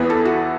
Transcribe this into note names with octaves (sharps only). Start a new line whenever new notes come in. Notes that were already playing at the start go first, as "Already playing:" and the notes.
Already playing: E2 E3 B3 B4
A4
F#4